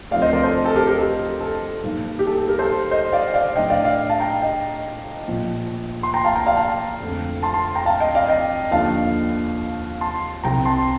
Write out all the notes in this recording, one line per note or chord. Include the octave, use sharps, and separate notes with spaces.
D2 D3 F3 C4 D5 F5
C5 D#5
A#4 D5
A4 C5
A4
G4 A#4
G4 A#4
A4
A4
G2 D#3 A#3
G4
A4
A4
G4 A#4
A4 C5
C5 D#5
D5 F5
D5 F5
A2 A3 D4 D#5 G5
D5 F5
D5 F5
F5 A5
G5 A#5
D#5 G5
A#1 A#2 F3
C6
G5 A#5
F5 A5
G5 A#5
D5 F5
F5 A5
F2 D3 A3 C4
A5 C6
A5 C6
G5 A#5
F5 A5
D#5 G5
D5 F5
D#5 G5
D#2 D3 F3 A#3 D4 F5 A5
A5 C6
C2 C3 G3 C4 G5 A#5
A5 C6